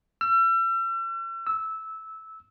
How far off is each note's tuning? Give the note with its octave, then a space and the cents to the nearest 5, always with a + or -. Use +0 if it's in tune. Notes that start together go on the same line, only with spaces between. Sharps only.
E6 +40
E6 -15